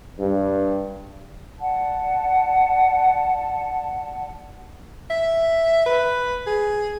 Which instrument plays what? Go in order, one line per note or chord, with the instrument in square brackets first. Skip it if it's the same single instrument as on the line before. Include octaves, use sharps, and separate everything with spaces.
[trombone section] G2
[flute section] D5 F#5 A5
[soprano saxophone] E5
B4
G#4